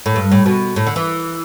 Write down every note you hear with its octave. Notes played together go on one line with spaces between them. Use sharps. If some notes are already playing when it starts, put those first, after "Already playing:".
A2
G2
A2
B2
A2
D3
E3